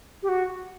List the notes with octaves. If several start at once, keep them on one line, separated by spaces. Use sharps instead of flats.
G4
F#4